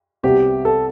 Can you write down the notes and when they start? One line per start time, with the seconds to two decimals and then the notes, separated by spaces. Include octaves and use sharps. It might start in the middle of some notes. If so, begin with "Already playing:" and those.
0.23 C2 C3 G3 B3 F#4 G4
0.65 A4